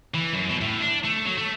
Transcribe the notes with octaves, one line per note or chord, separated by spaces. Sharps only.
E3
F#2
B2
A2
D4
A3
F#3
A3